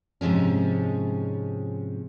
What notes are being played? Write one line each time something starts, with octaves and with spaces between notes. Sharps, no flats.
G#2 C3 F3 G#3 C#4